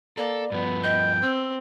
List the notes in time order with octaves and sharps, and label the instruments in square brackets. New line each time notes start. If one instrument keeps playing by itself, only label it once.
[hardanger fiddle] A#3 [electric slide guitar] A4 [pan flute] D5
[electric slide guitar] G2 F3 [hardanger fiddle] B3
[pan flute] D#5 [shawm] G5
[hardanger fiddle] C4 [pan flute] E6